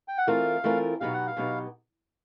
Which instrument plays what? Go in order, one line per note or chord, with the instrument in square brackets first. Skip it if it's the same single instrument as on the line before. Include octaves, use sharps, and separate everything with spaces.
[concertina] G5
F#5
[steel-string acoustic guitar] E3 A3 C4 F4 A#4 [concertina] F5
[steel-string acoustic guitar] E3 A3 C4 F4 A#4
[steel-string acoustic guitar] B2 F#3 B3 D#4 G4 [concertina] F5
[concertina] F#5
F5
[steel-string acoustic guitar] B2 F#3 B3 D#4 G4